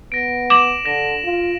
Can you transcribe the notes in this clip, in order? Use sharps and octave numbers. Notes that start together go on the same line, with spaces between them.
B3 A#6 D7
D6 E7 F#7
D3 A#6 E7
F4